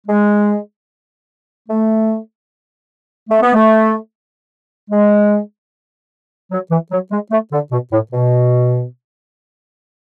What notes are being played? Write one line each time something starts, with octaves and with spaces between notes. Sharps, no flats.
G#3
A3
A3
B3
A3
G#3
F#3
E3
F#3
G#3
A3
D3
B2
A2
B2